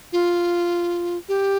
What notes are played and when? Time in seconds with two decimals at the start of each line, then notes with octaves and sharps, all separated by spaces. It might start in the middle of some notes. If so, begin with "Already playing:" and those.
0.12 F4
1.29 G4